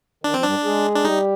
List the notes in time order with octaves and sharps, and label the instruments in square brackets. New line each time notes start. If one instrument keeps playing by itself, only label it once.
[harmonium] D#3 [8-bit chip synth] D4
[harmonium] F3 [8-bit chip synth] C4
[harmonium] G2 G3 [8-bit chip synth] D4
[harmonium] G#3 G#4
[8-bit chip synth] D4
[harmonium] G3 G4 [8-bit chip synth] D#4